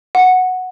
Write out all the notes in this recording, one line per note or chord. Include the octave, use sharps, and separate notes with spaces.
F#5